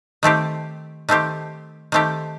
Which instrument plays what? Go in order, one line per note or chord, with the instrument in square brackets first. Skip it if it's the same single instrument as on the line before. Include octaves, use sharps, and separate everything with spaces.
[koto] D#3 A3 C4 G4
D#3 A3 C4 G4
D#3 A3 C4 G4